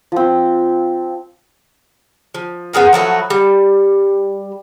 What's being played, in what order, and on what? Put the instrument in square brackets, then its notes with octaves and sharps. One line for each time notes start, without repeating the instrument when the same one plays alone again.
[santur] F3 C4
[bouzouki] F3
B3 D4 G#4 A#4
F3 F#3 A3 B4
G3